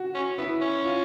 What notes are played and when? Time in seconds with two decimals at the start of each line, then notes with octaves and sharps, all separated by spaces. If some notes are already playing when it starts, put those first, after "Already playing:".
Already playing: F#4
0.14 C#4
0.38 B3 E4
0.61 C#4
0.85 F4